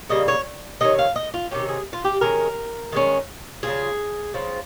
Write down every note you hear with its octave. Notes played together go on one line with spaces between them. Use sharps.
C#3 G3 A#3 D#5
C#5
C3 D#3 C#4 D#5
F5
D#5
F4
C3 D#3 G#3 C#4 G4
G#4
F4
G4
D#3 G#3 C#4 A#4
D#3 G#3 C#4
C#3 F3 C4 F4 G#4
C#3 F3 C4 F4